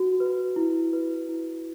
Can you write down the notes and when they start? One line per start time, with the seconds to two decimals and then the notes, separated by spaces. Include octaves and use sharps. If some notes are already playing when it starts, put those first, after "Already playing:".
Already playing: F#4
0.20 B4
0.56 E4
0.93 B4
1.29 E4